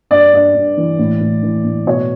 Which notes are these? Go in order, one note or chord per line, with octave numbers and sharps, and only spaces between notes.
G2 D5
G2 D5
G2
E3
A2
A2
E3
A2
B2 C#5